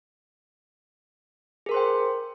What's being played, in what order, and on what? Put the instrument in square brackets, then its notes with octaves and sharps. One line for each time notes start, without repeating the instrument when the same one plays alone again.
[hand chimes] G#4
A#4
C6
C5
G5